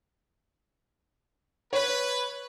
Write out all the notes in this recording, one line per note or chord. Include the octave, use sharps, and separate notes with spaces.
B4 C#5